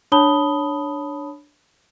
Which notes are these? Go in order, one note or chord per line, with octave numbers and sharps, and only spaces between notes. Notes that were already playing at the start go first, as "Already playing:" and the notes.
D4 C#5 A5 B5 D#6 G7